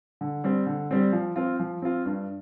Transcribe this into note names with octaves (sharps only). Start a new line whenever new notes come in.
D3
G3 C4
D3
G3 C4
F3
C4 F4
F3
C4 F4
G2